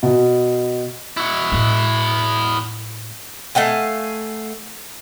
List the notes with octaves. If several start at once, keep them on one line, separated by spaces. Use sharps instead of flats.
B2
E4 F#4
A2 G#3
A3 F5 F#5 G#5